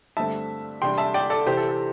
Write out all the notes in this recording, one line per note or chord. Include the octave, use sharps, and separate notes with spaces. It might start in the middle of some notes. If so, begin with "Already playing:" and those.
G2 D3 A3 C4 E5 A5
E2 C3 G3 D4 G5 C6
E5 A5
D5 G5
A4 D5
C3 E3 C4 G4 C5
A4
A4